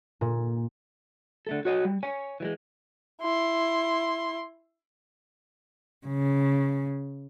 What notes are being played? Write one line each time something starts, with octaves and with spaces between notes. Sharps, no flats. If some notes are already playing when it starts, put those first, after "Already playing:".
A#2
D3 A3 A4
F#4 C#5 D#5
G3
C#5 G#5
E3 G3 G#3
E4 C6
C#3